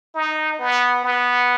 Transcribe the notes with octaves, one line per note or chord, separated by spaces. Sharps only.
D#4
B3
B3